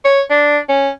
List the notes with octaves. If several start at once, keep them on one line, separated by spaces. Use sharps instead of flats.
C#5
D4
C#4